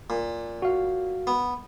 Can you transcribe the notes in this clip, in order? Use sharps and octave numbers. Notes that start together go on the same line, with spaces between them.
A#2
F#4 F5
B3